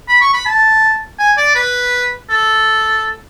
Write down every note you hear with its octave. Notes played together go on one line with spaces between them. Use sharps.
B5
C#6
B5
A5
G#5
D5
B4
A4